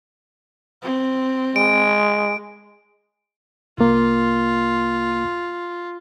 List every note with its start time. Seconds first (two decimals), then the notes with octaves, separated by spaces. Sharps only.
0.83 C4
1.56 G#3 D7
3.78 C2 A#3 F4